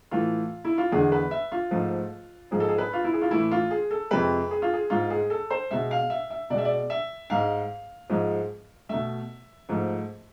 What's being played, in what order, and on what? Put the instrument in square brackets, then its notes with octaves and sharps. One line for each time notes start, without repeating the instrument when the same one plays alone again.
[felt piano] A2 E3 A3 F4
E4
F4
E2 D3 G#3 G#4
B4
E5
F4
G#2 F3 A3
G#2 F3 G#3 G#4
A4
G#4
B4
F4
E4
G#4
F4
A2 E3 A3 E4
F4
G#4
A4
F2 C3 G#3 B4
G#4
F4
G#4
G#2 G#3 F4
G#4
A4
C5
B2 G#3 E5
F5
E5
E5
B2 D5
G#3 E5
D5
E5
G#2 G#3 F5
G#2 F3 G#3
B2 A3 E5
G#2 F3 A3